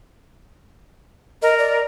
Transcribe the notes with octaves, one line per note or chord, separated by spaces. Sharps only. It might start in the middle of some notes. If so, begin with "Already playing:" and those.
A#4 D#5
D5